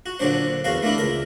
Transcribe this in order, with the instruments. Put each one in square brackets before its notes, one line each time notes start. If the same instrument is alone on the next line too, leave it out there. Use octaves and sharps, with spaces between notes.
[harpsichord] F#4
A#2 D3 F#3 D4 C5
E2 F#4 A#4 F5
A3 A#3 D4 E4
C#2 A#4